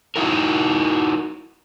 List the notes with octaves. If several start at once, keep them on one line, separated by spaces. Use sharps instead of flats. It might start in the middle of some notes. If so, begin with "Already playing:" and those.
D#4 E4 F#4 A#4